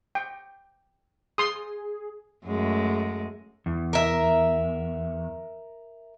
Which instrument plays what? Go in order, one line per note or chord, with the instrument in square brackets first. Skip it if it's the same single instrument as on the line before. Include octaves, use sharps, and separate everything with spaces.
[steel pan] G5
[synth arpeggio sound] G#4 [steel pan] C6 D#6
[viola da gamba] F#2 G#3 A3
[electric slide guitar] E2
[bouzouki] A#4 E5